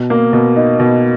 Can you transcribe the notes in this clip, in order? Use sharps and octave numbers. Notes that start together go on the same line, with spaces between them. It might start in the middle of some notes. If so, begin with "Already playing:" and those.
Already playing: B2
A#3
B2
D#4
B2